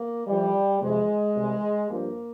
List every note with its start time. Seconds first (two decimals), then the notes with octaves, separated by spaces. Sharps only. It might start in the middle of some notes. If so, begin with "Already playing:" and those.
Already playing: A#3
0.27 F2 E3 G3
0.81 F2 C3 E3 G#3
1.35 C2 C3 E3
1.89 G2 F3 A#3